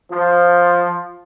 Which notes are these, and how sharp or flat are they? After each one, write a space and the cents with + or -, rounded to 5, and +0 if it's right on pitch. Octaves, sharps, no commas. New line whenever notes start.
F3 +5